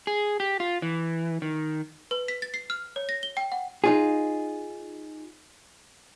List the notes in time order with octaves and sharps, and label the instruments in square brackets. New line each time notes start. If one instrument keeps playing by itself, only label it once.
[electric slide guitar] G#4
G4
F4
E3
D#3
[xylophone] B4
B6
A6
C7
F6
C#5
A#6
G7
G5
F#5
[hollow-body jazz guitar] D#4 F4 G#4